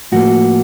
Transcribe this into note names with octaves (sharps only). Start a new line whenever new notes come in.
A2 F3 A#3 F#4